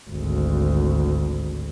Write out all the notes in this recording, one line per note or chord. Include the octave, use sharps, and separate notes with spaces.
G#1 D2